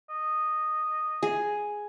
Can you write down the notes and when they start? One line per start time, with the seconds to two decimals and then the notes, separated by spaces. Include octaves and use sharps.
0.10 D#5
1.23 G#4